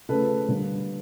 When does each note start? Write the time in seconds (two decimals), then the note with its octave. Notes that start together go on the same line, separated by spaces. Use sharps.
0.09 C#3 F3 A3 A4 B4
0.48 D3 G3 A#3